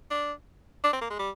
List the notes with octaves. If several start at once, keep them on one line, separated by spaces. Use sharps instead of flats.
D4
D4
C4
A#3
G#3
G3